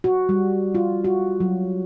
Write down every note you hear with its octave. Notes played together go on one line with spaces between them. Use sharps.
F#4
G3
F4
F#4
F#3